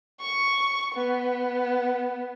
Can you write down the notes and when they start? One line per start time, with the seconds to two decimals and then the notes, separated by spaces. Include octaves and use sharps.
0.21 C#6
0.95 B3